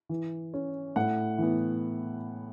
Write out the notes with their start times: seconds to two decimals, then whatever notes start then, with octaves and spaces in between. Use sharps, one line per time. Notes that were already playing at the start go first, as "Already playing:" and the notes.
0.09 E3
0.54 C#4
0.96 A2 F#5
1.38 E3 B3